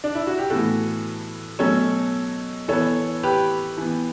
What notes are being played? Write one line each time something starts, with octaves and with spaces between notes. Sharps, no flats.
D4
E4
F#4
G4
A2 E3 B3 F#4 A4
B2 F#3 A3 C#4 A4 C#5
E3 B3 A4 C#5
G4 B4
E3 B3